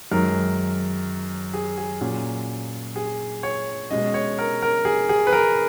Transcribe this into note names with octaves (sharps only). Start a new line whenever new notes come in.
F#2 D#3 G#3 A#4
G#4
G#4
A#2 F#3 C#4
G#4
C#5
B2 G#3 C#4 D#5
C#5
A#4
A#4
G#4
G#4
B4
A#4